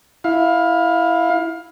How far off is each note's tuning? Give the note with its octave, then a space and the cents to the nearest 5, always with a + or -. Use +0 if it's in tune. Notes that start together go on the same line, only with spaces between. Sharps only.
E4 +0 F5 +20